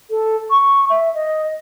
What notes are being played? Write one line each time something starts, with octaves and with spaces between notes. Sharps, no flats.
A4
C#6
E5
D#5